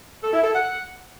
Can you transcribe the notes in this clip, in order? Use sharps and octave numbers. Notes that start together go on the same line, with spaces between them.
A4
E4
A4
F#5